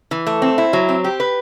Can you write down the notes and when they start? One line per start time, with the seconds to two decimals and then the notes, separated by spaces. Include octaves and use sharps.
0.11 E3
0.27 A3
0.42 C4
0.58 E4
0.73 F#3
0.89 C4
1.04 G4
1.20 B4